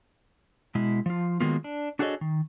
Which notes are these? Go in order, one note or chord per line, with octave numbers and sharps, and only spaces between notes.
B2 G#3 E4
F3 F4
D#3 F#3 G#3 A#3 B3 F4
D4
D4 F#4 G#4 A4 C#5 D#5
D#3